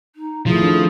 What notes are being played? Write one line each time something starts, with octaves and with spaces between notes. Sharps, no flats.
D#4
D#3 F3 A3 E4 G#4
C4 D4 A4